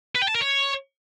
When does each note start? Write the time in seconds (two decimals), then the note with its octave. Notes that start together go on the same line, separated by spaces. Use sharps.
0.15 B4
0.22 G5
0.28 A5
0.34 A#4
0.41 C#5